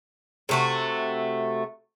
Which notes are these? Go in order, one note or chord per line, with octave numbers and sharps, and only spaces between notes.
C3 A3 F#4